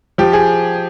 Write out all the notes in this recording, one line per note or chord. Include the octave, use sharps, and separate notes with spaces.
F3 G4
G#4